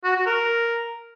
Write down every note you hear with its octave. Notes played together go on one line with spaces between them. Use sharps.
F#4
F#4
A#4